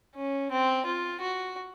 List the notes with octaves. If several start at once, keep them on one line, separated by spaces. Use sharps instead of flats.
C#4
C4
F4
F#4